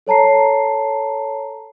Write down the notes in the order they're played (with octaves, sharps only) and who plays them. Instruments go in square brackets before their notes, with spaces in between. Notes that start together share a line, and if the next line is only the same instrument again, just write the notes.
[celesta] A4 C#5 A5 A#5 C7